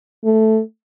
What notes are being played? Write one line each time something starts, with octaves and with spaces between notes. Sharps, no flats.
A3